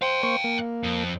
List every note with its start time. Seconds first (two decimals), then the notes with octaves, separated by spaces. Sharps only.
0.02 C5 F5 G5
0.23 A#3 C5 C#6
0.44 A#3
0.84 F2